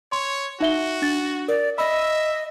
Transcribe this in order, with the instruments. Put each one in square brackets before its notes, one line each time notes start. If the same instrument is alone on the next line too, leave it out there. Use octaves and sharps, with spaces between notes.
[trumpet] C#5 [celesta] C6
[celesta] D#4 E5 G7 [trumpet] F#4
[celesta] D4 A6
[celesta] A#4 [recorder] D5
[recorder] D#5 [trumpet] E5 [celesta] B5 E6